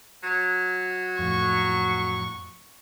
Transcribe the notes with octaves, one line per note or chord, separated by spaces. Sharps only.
F#3
F2 A2 C#6